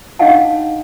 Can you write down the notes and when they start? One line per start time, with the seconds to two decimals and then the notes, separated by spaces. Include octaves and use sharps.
0.19 D4 D#4 D#5 F5 F#5 A5